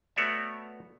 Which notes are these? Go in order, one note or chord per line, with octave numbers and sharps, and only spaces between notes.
A3 B3 F#4 C#5 D5 E5